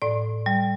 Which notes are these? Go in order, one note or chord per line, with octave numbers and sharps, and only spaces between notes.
A2 D5
G3